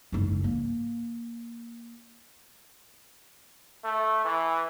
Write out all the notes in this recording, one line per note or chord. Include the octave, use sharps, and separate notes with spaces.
F#1 G#2
A#3
A3
E3